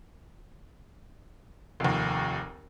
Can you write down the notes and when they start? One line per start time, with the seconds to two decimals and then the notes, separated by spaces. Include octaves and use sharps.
1.80 F1 D#2